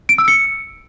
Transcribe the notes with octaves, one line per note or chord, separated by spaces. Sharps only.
D7
E6
C#7